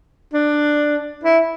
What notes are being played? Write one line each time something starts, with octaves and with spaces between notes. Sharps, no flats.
D4
E4